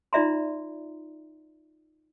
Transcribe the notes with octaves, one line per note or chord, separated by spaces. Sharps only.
D#4 F4 D5 E5 A#5 C6